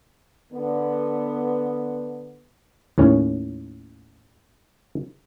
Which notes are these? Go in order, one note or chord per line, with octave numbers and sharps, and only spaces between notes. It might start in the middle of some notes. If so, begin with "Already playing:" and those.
D3 B3
D#2 A2 C#4